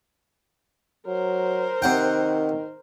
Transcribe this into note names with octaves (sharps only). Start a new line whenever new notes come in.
F#3 A#4 C5
C3 D#3 F#5 G5